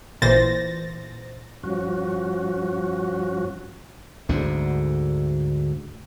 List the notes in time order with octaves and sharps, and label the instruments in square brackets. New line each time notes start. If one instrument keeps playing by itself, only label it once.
[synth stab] A1 A#2 E3 C5 A6 A#6
[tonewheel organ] G2 F3 C#4 F#4
[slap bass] D2 G#2 D3